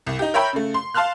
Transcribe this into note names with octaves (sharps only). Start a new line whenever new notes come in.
C2
D#4 G4
A#4 C#5 E5 G5 B5
C#3 A3
C6
F5 A5 C6 F6 F#6